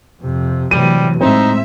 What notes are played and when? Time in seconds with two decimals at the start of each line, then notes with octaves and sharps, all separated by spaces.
0.21 F2 C3
0.71 A2 C3 E3 F#3 G3 D#7
1.21 A2 G#3 C4 D#4 E5